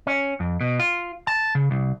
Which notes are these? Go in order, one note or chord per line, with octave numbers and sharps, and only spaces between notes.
C#4
F2
B2
F4
A5
C#3
C2